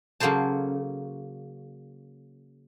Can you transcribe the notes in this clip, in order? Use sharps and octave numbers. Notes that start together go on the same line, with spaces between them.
C#3 F#3 A#3 A4 C5 A5